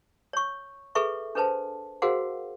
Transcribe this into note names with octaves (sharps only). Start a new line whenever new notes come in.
C#5 C#6
G#4 A4 B4 E5 C#6
D4 A4 B4 C5 A5
F#4 G#4 A#4 C5 F5 F#5